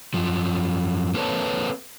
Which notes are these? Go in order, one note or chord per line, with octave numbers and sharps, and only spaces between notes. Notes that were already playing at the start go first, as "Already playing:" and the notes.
F#2 F3
A#3 C4 A4 B4 C#5 A5